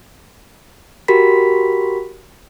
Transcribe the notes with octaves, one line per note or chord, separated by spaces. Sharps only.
F#4 G4 A#4 B5 B6